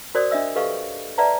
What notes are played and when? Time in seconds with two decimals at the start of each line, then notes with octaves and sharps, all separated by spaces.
0.15 F#4 A#4 C5 D5 D#6
0.31 D4 D#5 E5 E6
0.56 G4 A4 B4 D#5 F5 C#6
1.18 B4 D5 E5 F#5 A5 A#5